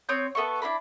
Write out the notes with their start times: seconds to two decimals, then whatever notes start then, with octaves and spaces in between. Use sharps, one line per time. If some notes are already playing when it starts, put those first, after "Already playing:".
0.09 C4 C#5 D#6 G6
0.35 B3 A4 E5 C#6
0.62 D4 E4 F#4 B5